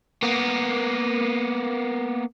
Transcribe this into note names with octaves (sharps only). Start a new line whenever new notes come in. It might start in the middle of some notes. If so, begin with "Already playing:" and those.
A#3 B3